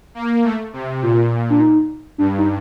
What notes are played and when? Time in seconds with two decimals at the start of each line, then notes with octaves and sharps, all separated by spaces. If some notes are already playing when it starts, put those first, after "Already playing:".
0.15 A#3
0.44 A3
0.73 C3
1.02 A#2 F4
1.50 D4
1.60 D#4
2.18 G2 D4
2.38 D#4